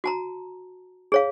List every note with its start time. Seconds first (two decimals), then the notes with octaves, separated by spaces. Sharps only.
0.04 F#4 A5 A#5
1.12 G#4 C#5 F5